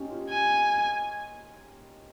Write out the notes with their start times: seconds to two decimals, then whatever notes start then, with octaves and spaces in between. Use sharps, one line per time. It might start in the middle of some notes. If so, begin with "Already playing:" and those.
Already playing: C#4 D#4 G4
0.10 F4
0.30 G#5